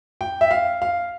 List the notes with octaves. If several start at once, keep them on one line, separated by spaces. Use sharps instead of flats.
G5
E5
F5
F5